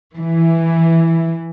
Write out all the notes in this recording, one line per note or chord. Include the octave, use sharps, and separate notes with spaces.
E3